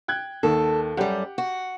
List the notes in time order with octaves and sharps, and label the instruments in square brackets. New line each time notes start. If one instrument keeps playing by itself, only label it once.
[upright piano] G5 F#6 G#6
[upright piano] D#2 D#3 [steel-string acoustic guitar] A4
[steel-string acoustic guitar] F#2 G3 [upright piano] G4 F#5
[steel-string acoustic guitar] F#4